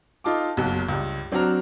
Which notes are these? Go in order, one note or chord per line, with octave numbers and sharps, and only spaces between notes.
D#4 F4 A4 D6
F#1 B1
C#2 G2
F#3 C4 D4 F#4 A#5 F6